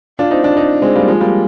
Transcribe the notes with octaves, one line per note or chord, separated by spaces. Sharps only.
D4 F4
C4 D#4
D4 F4
C4 D#4
G#3 C4
G3 A#3
F3 G#3
G3 A#3